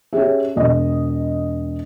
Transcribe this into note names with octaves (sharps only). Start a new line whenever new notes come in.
C#4 G4 G#4 E5
E1 D#5